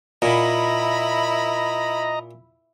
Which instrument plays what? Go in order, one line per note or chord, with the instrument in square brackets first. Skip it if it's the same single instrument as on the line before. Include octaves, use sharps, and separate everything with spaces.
[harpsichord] A#2 [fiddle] E4 B5 [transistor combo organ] D#5 A#5